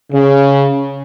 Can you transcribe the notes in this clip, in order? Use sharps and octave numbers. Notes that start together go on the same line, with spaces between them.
C#3